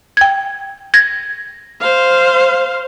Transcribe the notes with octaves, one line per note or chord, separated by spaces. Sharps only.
G5 G#6
G#6 A#6
C5 F5